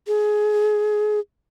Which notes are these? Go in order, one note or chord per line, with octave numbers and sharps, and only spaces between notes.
G#4